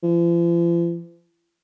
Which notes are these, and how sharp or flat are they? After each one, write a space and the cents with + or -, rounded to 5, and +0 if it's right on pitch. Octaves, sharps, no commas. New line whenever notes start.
F3 -45